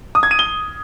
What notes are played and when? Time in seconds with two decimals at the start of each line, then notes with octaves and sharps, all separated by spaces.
0.15 D#6
0.23 G#6
0.31 D#7
0.39 G7